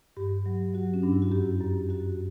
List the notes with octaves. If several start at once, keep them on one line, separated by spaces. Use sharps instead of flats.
G2 G4
F#3
F#3 F#4
C#4
G2 D4
E4
F#4
F#2 G4
F#2
F#2 F#4